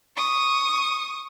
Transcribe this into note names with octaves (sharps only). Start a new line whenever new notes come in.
C#6 D#6